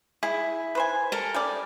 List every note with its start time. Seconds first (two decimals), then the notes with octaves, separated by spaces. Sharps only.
0.23 E4 G#4
0.75 B4 C5 G#5
1.12 A4 A#4
1.34 G3 C#4 D5